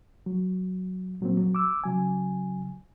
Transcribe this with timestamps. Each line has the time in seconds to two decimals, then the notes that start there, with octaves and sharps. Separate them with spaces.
0.26 F#3
1.21 A#2 F#3 A#3 C4
1.37 F#3
1.55 D6 E6
1.84 C#3 F#3 G#5